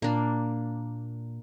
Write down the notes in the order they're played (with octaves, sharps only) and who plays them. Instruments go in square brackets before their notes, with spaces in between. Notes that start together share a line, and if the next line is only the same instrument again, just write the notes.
[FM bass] A#2 [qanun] A#3 D4